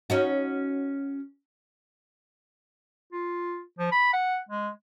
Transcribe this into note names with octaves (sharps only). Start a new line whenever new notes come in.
C#4 D#4 F#4
F4
F3
B5
F#5
G#3